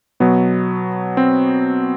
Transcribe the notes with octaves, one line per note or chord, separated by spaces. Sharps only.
B2 F#3 B3
C4